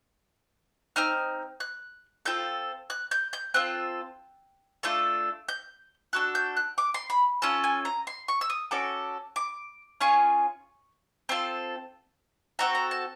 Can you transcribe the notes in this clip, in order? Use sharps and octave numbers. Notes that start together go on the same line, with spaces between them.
C4 D#4 F6
F#6
C4 F4 A4 G6
F#6
G6
G6
C4 F4 A4 F#6
A3 D4 F4 A4
G6
D4 F#4 A4 F#6
G6
F#6
D6
C6
B5
C#4 F4 A4 A5
G#5
A#5
C6
C#6
E6
D#6
C#4 F#4 A4 D6
D6
C#4 F4 G#4 C#6
C4 F4 A4 C6
C4 D#4 F#4 A4 A#5
A#5
A5